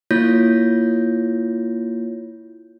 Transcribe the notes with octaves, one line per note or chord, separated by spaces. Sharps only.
A#3 E4 F4 C#5 G6 A#6